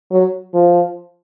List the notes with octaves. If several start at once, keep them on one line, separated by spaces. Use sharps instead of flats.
F#3
F3